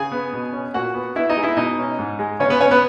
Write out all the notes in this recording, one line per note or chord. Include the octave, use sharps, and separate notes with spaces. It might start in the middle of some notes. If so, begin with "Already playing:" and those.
Already playing: C#3 G#4 G#5
B3
B2
C#4
A#2 F#4 F#5
B3
B3 E4 E5
D#4 D#5
G#3
E4 E5
B2 D#4 D#5
C#4
G#2
G#3
C#3 C#4 C#5
B3 B4
B3 C#4 C#5
B3 B4